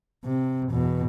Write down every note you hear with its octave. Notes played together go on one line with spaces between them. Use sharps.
C3
E2 B2